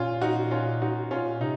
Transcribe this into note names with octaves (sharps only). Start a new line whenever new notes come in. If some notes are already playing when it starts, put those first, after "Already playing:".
Already playing: A#2 C#4 F4
D#4 F#4
C#4 F4
D#4 F#4
A#2 C#4 F4
C3 D#4